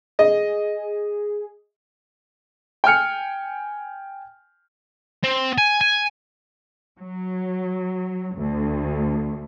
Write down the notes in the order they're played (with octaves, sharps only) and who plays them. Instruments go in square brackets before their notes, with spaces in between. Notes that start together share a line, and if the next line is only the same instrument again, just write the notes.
[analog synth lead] G#4 [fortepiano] D#5
[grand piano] G5 G#5 F6 C#7
[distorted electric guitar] C4
G#5
G#5
[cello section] F#3
D2